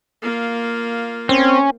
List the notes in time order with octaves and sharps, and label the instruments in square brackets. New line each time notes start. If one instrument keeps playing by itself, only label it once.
[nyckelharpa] A#3 F4
[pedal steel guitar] C4 [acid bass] C#4